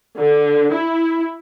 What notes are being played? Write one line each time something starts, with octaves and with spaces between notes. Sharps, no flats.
D3
E4